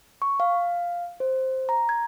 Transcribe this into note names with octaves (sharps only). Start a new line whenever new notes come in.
C#6
F5
C5
A#5
G#6